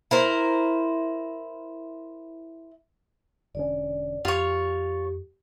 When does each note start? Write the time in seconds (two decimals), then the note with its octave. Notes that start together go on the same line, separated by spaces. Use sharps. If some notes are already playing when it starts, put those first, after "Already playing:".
0.11 E4 A#4 C5
3.55 E1 D3 C#4 D5
4.25 F2 F4 G4 C#5